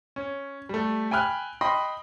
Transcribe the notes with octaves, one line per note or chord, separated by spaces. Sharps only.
C#4
G3 A3
G5 G#5 B5 F6 F#6
D#5 G5 B5 C6